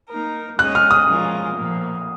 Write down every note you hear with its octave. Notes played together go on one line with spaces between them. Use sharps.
A#3 D#4 A#4
G#3 C#4 G#4 D#5 F#6
F6
D#6
F3 G#3 C#4 F4 A#4
A#2 F3 A#3